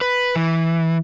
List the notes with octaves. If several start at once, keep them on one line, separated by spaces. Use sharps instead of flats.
B4
E3